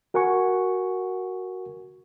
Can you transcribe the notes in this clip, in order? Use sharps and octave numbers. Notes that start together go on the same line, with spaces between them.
F#4 A#4 F#5 G#5 C#6